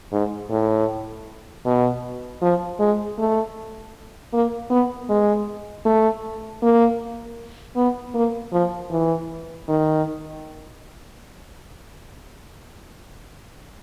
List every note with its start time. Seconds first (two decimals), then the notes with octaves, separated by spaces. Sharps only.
0.12 G#2
0.50 A2
1.66 B2
2.42 F3
2.79 G#3
3.18 A3
4.33 A#3
4.70 B3
5.09 G#3
5.85 A3
6.62 A#3
7.76 B3
8.14 A#3
8.52 F3
8.91 E3
9.68 D#3